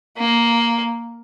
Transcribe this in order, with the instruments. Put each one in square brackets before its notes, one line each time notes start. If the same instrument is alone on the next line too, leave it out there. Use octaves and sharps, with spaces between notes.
[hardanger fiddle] A#3